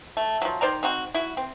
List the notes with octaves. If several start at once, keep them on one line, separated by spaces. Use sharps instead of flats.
A3
F3 F#3
D#3 C5 D5 A#5
C4 D#4 F#4
E4 F#4
C4